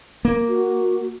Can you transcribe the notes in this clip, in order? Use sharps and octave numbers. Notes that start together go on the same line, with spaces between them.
A#3
F#4